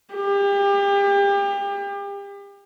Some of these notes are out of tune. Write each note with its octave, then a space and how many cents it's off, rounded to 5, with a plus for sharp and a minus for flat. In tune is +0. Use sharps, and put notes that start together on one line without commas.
G4 +35